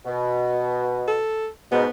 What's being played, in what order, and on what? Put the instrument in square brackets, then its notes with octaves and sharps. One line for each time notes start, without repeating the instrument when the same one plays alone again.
[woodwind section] B2
[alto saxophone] A4
[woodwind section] G#2 B2 [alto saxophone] B3